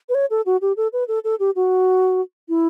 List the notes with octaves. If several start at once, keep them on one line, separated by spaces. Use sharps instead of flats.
B4
C#5
A4
F#4
G4
A4
B4
A4
A4
G4
F#4
E4